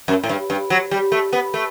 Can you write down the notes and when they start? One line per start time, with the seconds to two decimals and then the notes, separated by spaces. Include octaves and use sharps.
0.08 F#2
0.23 A2
0.29 G2
0.50 G2
0.70 F#3
0.91 G3
1.12 A3
1.33 B3
1.54 A3